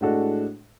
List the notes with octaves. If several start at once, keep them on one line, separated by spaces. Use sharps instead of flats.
A2 G#3 D4 F#4 A4